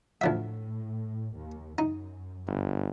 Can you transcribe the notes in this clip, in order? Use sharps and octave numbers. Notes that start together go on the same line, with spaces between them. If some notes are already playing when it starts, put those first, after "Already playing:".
D2 A2 F3 E5
D#2
F#2 D#4
G1